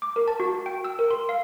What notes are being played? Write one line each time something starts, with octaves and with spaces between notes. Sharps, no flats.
D6
A#4
A5
F#4
G5
E6
A#4
C6
F5